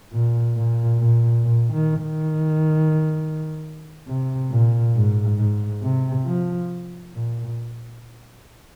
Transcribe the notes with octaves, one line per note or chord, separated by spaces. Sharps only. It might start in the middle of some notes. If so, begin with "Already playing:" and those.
A#2
A#2
A#2
A#2
D#3
D#3
C3
A#2
G#2
G#2
C3
F3
A#2